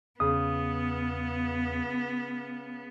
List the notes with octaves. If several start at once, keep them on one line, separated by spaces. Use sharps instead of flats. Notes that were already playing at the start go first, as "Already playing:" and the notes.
E2 C#3 B3 D#6